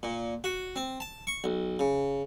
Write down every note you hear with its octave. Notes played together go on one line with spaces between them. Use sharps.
A#2
F#4
C4
A5
C#6
B1
C#3